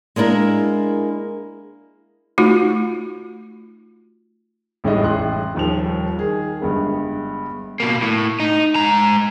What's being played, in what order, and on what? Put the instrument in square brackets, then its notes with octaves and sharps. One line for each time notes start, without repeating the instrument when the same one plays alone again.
[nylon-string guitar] G#3 A#3 D4 E4 A#4
[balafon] A3 D#4 F4 F#4
[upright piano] A1 A2 G3 G#3 D#5
A1 C6 F#6
D#1 D#2 F3 G#4 F7
D#3 G#4
G1 G2 G#3 B3
[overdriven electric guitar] B2 A#3
A2
D#4
G#3 A#5